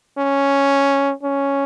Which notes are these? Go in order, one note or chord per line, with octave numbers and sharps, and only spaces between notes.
C#4
C#4